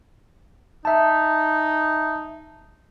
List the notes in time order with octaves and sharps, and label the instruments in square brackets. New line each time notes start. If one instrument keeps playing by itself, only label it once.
[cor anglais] D#4 [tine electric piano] E5 A5